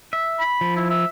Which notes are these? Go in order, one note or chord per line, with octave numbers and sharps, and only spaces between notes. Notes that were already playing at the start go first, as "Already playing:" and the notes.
E5
B5
F3
E4
E5